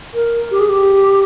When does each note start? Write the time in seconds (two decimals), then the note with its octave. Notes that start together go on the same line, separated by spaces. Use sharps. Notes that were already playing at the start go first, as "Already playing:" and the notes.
0.14 A#4
0.51 G4
0.59 G#4
0.69 G4